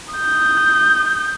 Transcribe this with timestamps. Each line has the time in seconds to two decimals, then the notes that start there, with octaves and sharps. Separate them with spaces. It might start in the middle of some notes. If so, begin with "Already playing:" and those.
0.14 D#6 G6